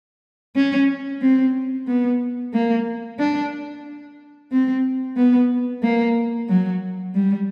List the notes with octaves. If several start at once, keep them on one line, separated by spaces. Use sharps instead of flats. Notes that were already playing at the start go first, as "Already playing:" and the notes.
C#4
C4
B3
A#3
D4
C4
B3
A#3
F#3
G3